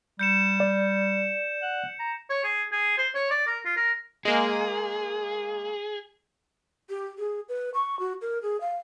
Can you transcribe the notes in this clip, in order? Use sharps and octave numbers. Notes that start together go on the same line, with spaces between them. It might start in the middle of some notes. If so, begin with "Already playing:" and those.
G3 G6 C#7 E7
D5
F#5
A#5
C#5
G#4
G#4
C5
C#5
D5
A#4
F4
A#4
G#3 A#3 G#4
G4
G#4
B4
C#6
F#4
A#4
G#4
F5